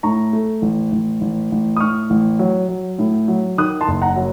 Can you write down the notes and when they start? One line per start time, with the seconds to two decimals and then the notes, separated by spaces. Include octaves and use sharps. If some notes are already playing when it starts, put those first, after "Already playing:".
0.03 A2 A#5 C#6
0.33 A3
0.62 A1
0.92 A1
1.21 A1
1.52 A1
1.76 D#6
1.80 A2 C#6 F6
2.10 A1
2.39 F#3
2.69 F#3
2.99 A2
3.28 F#3
3.58 D#3 D#6 F#6
3.81 A5 C6
3.88 F#1
4.02 F#5 A#5
4.16 F#3